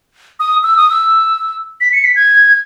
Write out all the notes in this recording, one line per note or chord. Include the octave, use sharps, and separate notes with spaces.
D#6
E6
D#6
E6
B6
C#7
B6
G#6